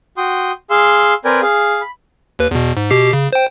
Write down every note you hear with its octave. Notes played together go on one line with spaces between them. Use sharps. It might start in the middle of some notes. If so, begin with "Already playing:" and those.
F#4 G5 C6 D#6
G#4 F5 C6 E6
C4 A#4 B4 D5 G5 G#5
G#4 F5
B5
D#2 B4
E2 B2
G#2
B2 G4 C7
C#3
C5 G5